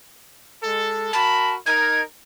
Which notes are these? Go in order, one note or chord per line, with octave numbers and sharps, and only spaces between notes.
G#3 A4
F#4 A#4 A5 B5
D#4 A#4 G#6